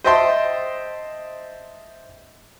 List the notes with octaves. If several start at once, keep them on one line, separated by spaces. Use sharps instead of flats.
C5 D#5 E5 G5 A5 C6